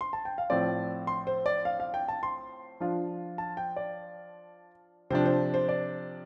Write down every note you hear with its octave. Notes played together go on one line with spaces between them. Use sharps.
C6
A5
G5
F5
A2 F3 C4 F4 D5
C6
C5
D5
F5
F5
G5
A5
C6
F3 D4 F4
A5
G5
D5
C3 F3 D4 C5
C5
C5
D5